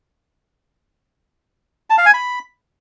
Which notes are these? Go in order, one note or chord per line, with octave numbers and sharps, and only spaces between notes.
A5
F5
G#5
B5